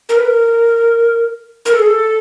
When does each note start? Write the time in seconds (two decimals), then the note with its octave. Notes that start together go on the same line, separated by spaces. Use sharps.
0.09 A#4
0.17 B4
0.25 A#4
1.65 A#4
1.72 A4
1.79 G#4
1.86 A4